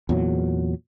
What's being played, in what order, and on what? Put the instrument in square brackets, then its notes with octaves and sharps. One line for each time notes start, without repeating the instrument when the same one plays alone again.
[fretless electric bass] E2 A#2 F#3